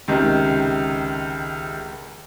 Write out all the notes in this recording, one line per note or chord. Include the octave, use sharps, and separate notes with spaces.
C#2 C3 D#3